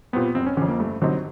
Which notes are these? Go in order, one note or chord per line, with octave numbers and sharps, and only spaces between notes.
A#2 G3 B3 C4
F#1 C4
C#4
F2 D3 C#4
A#3
G2 A3
D3 F#3 G3 C4 D#4